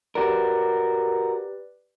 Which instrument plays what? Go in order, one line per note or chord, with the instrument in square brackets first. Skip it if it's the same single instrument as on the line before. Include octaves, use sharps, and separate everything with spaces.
[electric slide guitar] F#4 A#4 [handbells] G4 B4 D5